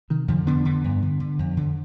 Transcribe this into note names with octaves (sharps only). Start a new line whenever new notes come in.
C3 D#3
F2 D3 F3
D3 B3 D4
D3
G2
D3
D3
F2
D3